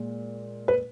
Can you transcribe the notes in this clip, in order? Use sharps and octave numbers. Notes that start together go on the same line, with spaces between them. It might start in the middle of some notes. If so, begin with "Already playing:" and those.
Already playing: A#2 G#3
B4